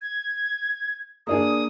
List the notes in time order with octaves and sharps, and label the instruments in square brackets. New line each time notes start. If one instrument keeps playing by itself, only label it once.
[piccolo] G#6
[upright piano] A#3 D4 G#4 [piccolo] D#6